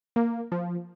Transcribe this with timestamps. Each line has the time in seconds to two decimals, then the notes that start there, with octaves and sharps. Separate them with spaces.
0.16 A#3
0.52 F3